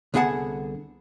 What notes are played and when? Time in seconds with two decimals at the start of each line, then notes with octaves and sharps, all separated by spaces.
0.14 C2 D3 B3 G#4 F#5 A5